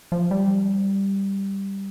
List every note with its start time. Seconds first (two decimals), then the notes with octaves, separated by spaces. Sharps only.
0.12 F3
0.31 G3